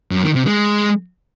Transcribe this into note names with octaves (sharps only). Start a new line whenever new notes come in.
F#2
D#3
C3
G#3